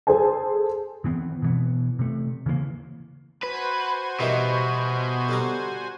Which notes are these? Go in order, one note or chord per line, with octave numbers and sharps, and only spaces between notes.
G#4 A4 C5 G#5 A5
D#3 E3 B3 C4
B2 E3 B3
C3 A3
C#3 E3 F#3 A#3
F#4 B4 C5 G#5
B2 D#3 E3 G3
D3 G3 A#5